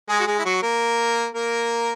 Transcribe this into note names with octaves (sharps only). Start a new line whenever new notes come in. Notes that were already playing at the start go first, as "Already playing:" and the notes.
G#3 G#4
F#4
G#3 G#4
E4
F#3 F#4
A#3 A#4
A#3 A#4